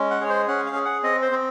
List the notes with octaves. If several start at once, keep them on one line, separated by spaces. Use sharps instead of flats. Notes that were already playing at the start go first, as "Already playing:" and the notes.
Already playing: G#3 C#4
F#5
G#4 C#5
C5
C#4 F#5
F5
G#4
F#5
C4 D#5
C5
C4